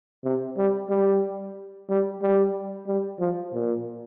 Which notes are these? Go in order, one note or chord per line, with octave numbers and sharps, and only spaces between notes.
C3
G3
G3
G3
G3
G3
F3
A#2